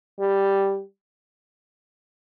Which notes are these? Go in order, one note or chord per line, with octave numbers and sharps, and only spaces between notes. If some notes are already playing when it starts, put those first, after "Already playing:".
G3